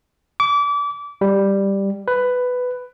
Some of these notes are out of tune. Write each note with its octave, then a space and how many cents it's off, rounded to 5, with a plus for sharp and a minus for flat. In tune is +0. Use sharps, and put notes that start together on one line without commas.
D6 -30
G3 +5
B4 +10